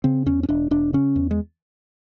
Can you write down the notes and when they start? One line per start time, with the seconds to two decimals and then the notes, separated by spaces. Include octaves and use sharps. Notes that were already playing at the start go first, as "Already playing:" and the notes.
0.04 C#3 C4
0.26 E2 C#4
0.43 C#4
0.49 E1 D4
0.71 E1 D4
0.93 C#3 C#4
1.16 E2
1.31 G#3